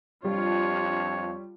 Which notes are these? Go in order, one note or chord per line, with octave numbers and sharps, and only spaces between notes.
F2 G3 D4 F4 G4 C#5